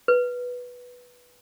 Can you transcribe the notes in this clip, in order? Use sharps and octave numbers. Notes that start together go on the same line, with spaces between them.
B4